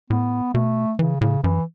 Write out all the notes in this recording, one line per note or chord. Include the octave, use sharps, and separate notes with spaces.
A2 B3
B2 A3
C#3 E3
A2 C#3
F#2 E3